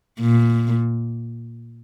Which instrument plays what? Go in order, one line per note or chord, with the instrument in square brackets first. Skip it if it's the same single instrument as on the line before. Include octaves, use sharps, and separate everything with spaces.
[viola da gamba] A#2